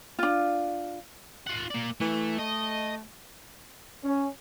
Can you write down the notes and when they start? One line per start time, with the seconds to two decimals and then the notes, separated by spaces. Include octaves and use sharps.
0.19 D4 F4
1.47 F4 F#5
1.71 A#3 D5
2.01 E3 A3
2.38 A3 D#5
4.04 C#4